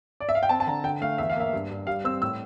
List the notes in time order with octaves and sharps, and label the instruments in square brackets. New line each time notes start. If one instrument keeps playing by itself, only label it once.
[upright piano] D5
E5
F5
G5
C4 A5
A5
D3 A#5
D3 G5
A3 F5
E2 E5
F5
A#3 E5
G2
G2
G3 F5
C4 E6
A2 E6